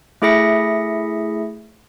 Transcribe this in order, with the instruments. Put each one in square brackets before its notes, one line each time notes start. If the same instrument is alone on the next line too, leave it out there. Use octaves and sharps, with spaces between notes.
[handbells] A3 E4 G#4 E5 A#6 C#7